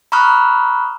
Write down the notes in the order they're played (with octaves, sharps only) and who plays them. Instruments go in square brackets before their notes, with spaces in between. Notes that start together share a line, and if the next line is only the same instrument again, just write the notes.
[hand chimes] A#5 B5 C#6 D#6 F6 F#6